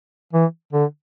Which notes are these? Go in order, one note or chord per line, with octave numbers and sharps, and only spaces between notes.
E3
D3